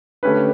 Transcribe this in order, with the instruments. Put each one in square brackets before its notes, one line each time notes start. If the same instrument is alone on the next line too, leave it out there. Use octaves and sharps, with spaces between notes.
[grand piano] D3 A3 C#4 G4 B4